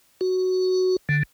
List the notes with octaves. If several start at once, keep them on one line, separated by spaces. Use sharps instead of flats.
F#4
D3